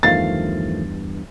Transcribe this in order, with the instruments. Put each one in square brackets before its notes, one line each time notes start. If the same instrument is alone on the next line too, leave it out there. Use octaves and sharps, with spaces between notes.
[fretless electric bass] E2 G2 [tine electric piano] D#3 F3 A3 [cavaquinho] F5 [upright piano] A6